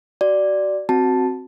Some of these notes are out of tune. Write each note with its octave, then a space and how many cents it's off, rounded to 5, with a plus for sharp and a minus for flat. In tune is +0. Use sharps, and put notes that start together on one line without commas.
F#4 +30 D5 +0
C4 +0 F#4 +0 A5 +0